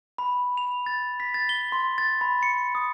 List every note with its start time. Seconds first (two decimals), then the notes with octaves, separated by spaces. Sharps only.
0.18 B5
0.57 F7
0.86 A6
1.20 B6
1.34 A6
1.49 G7
1.72 C6
1.98 A6
2.21 B5
2.43 C#7
2.75 D#6